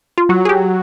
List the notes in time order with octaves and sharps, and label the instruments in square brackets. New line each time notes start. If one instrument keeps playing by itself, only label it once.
[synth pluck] F4
[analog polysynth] F#3 [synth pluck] F#4
[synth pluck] G#4
G4